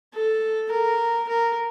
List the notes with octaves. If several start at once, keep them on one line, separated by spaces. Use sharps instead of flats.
A4
A#4
A#4